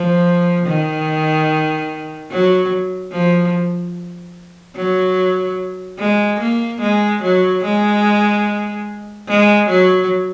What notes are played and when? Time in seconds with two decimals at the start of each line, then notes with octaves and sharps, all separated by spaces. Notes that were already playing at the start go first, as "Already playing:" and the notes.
Already playing: F3
0.67 D#3
2.31 F#3
3.12 F3
4.76 F#3
5.99 G#3
6.40 A#3
6.81 G#3
7.23 F#3
7.65 G#3
9.28 G#3
9.69 F#3